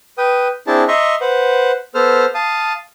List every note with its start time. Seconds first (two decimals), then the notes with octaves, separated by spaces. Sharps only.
0.18 B4 G5 D#6
0.67 C4 D4 E4 G#4 A5
0.88 D#5 E5 A#5 C6 C#6
1.21 B4 C5 F#5
1.95 B3 A4 C5 F6
2.35 F5 A5 D#6